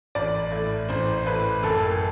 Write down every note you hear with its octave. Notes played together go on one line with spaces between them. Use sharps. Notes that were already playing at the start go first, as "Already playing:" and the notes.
A1 D5
A2
A1 C5
A2 B4
F#1 A4